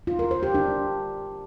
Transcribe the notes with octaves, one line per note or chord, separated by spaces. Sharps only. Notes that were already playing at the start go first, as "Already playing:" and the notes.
F4
A#4
C5
G4
D4